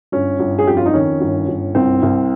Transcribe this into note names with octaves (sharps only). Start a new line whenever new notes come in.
G1 C#4
G1
G#4
F2 G4
F4
D#4
D#3 C#4
G1
G1
C2 C4
C2